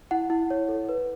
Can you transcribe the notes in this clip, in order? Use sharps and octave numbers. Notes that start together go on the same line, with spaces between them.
E4 F#5
E4
C#5
A4
B4